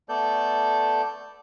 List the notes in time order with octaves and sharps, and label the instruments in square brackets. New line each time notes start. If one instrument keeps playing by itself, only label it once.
[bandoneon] A3 B3 A4 D5 G6